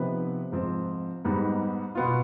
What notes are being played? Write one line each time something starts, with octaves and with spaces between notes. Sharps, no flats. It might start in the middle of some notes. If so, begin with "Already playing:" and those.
Already playing: C3 F3 B3 D#4 B4
G#2 F3 C4
G#2 G3 B3 D#4
B2 B3 F4